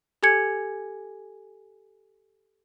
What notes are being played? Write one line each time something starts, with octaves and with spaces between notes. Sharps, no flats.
G4 A4 G#5 G#6 C#7